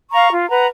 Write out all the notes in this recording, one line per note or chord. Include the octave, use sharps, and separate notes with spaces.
F5 A#5 C#6
F4
B4 F#5 A#5